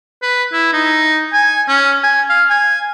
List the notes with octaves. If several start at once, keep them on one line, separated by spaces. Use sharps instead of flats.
B4
E4
D#4
G#5
C#4
G#5
F5
G#5